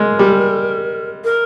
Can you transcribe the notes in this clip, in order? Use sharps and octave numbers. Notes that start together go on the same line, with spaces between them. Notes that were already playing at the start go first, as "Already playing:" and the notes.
Already playing: G#3 A#4
G3
A#4